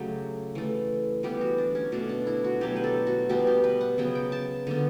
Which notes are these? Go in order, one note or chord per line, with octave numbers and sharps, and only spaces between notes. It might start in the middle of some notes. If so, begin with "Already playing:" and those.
Already playing: C#3 F#3 A3 G4
E3 A3
E3 G3 B3 G4
F#4
D4
C#4
B2 A3 D4
D4
E4
F#4
B2 F#3 A3 G4
B4
A4
F#4
B2 G3 B3 G4
G4
B4
F#5
C#3 F#3 B3 G5
G5
A5
D3 G3 B3